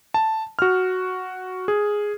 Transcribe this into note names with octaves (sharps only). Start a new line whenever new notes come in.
A5
F#4 F6
G#4